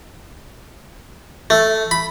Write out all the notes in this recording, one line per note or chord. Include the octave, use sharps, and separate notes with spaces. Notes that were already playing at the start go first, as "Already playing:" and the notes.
A3
B5